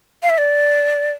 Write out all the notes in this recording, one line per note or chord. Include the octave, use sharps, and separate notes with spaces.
F5
E5
D5